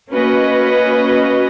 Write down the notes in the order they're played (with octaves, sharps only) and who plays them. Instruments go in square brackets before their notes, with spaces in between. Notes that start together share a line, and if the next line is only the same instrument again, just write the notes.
[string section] A#3 C#4 F#4 B4 D#5